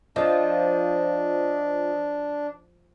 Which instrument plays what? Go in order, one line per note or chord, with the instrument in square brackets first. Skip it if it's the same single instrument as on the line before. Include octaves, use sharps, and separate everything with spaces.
[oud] F3 [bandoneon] D4 [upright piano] D#5